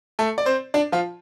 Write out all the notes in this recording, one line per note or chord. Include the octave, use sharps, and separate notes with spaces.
A3 A4
D5
C4 C5
D4 D5
F3 F4